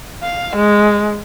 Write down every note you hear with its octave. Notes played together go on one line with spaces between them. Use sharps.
F5
G#3